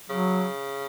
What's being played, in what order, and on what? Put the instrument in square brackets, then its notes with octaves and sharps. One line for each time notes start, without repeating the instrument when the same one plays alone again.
[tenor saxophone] C#3 [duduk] F#3